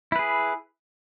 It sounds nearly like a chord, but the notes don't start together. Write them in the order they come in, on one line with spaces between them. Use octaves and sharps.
E4 B4 G#4